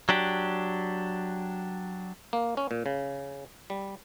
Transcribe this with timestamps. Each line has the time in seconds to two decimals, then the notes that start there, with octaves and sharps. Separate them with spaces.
0.09 F#3 D4 G4
2.33 A#3
2.57 C#4
2.71 A#2
2.86 C#3
3.70 G3